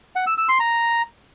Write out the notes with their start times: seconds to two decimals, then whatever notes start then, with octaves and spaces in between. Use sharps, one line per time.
0.16 F#5
0.27 E6
0.38 E6
0.49 C6
0.60 A#5